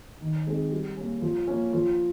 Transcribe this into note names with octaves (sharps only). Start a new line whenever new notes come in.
D#3
G#3 C4 D#4 G#4
G3
A#3 C#4
F3
A#3 C#4
F3